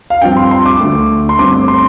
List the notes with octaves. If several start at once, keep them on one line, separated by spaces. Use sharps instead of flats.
F5
G2 F3 C4 G5
C6
C6
D6
D2 D3 A3
C6
G1 G2 D3 A3 C4 D6
C6